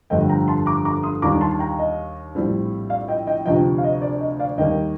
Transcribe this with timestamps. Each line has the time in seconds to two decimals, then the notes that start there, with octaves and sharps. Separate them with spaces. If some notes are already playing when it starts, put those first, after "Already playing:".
0.10 G1 F2 D3 A3 D#5 G5
0.29 G5 A#5
0.48 A5 C6
0.66 A#5 D6
0.85 A#5 D6
1.03 C6 D#6
1.22 D#2 D#3 G3 D4 A#5 D6
1.41 A5 C6
1.59 G5 A#5
1.79 D#5
2.35 A#1 A2 G3 C4
2.90 D5 F5
3.08 D#5 G5
3.27 D#5 G5
3.46 D2 C3 F3 D#5 G5
3.78 F5
3.84 D#5
4.02 D5
4.21 D#5
4.39 D5 F5
4.57 D#2 D#3 G3 A#3 D#5 G5